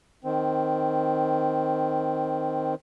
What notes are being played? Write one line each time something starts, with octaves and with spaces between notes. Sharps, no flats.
D#3 C4